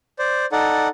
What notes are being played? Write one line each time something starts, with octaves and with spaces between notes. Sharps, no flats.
C5 D5
D#4 A4 D5 F#5